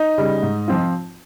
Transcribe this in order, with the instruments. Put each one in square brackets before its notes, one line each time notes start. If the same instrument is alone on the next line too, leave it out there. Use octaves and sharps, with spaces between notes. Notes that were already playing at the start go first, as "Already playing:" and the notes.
Already playing: [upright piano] D#4
[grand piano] C#3 G3
G#2
F3 C4 F4